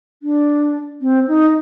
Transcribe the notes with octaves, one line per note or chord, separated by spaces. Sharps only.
D4
C4
D#4